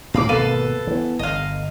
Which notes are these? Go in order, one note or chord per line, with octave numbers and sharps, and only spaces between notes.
A2 F5 B5 D6
G#1 B2 A#3 A4 B4 F5
E3 B3
G1 D#5 F5